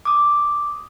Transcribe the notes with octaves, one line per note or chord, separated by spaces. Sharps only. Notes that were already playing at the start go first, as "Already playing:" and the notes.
D6 D#6